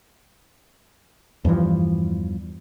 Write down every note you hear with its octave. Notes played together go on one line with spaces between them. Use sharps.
E2 G2 E3 F3